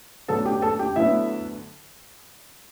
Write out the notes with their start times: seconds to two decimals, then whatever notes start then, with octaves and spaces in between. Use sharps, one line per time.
0.28 D2 D3 F#3 B3 A4 A5
0.45 G4 G5
0.62 A4 A5
0.79 G4 G5
0.96 D2 D3 F#3 B3 E4 E5